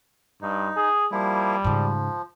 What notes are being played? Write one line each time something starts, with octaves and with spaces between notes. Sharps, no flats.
G2 D#4
G#4
F3 G3 A#3 E4
G#2 C#3 F3